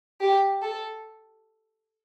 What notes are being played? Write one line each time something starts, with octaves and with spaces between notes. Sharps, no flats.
G4
A4